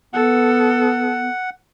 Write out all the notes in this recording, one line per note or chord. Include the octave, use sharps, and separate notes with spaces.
B3 A4 F#5